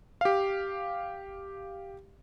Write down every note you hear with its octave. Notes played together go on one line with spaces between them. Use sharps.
G4 F5